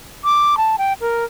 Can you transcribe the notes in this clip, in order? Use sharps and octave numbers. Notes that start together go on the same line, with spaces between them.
D6
A5
G5
A#4